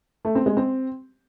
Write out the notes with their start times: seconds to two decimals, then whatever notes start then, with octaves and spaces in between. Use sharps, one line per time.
0.25 A3
0.35 C4
0.46 G#3
0.57 C4